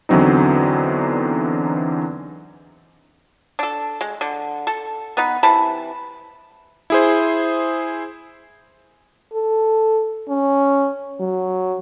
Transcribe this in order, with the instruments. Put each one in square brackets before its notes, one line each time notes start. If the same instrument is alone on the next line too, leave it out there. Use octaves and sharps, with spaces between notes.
[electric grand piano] E2 D3 E3 F#3 C4 D#4
[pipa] D4 A4
G#3
D3
A4
B3 D#4 B4
C3 E3 A5 B5
[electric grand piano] E4 G#4 C5
[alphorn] A4
C#4
F#3